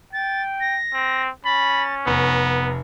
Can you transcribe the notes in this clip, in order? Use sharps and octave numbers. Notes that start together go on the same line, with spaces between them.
G5 A6
A#6
C4
C#4 B5 A6
F1 B3 A#5